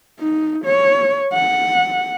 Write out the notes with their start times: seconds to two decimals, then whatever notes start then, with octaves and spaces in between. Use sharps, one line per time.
0.20 D#4
0.65 C#5
1.34 F#5